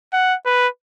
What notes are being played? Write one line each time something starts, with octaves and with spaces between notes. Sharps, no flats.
F#5
B4